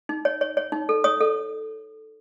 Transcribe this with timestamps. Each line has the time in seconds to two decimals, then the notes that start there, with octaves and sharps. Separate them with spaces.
0.09 D#4
0.25 C#5
0.41 C#5
0.57 C#5
0.72 D#4
0.89 A4
1.04 C#5 D#6
1.20 A4